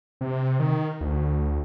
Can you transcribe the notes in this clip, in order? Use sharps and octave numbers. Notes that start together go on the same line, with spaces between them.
C3
D#3
D2